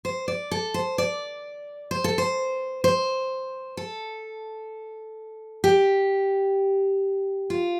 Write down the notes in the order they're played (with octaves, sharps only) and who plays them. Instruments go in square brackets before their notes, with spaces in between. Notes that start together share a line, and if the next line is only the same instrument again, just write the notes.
[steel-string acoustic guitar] C5
D5
A4
C5
D5
C5
A4
C5
C5
A4
G4
F4